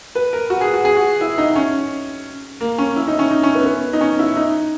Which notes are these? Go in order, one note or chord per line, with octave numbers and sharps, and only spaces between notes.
B4
A#4
F#4
G#4
F#4
G#4
F#4
E4
D#4
C#4
A#3
C#4
E4
D#4
C#4
D#4
C#4
B3
B3
D#4
C#4
E4
D#4